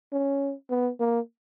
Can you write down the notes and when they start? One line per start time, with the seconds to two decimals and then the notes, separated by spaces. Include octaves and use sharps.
0.13 C#4
0.70 B3
1.00 A#3